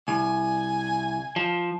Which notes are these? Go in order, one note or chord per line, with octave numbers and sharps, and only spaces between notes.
C2 G#5
F3